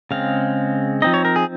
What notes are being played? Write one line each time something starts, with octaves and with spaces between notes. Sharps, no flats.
C#3 G#3 C4 F5
F3 C4 D#4 D#5
C#5
A#4
G#4